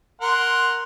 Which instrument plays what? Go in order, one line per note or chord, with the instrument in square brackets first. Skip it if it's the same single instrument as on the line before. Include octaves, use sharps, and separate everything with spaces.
[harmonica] A#4 F#5 C6